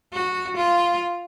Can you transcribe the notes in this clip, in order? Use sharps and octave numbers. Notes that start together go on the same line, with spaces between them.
F#4
F4